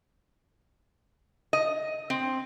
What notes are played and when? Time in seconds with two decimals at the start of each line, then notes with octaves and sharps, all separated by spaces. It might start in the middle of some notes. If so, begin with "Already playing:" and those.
1.53 D#5
2.10 C4